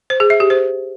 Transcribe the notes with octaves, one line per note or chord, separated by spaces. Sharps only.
C5
G#4
E5
G4
C5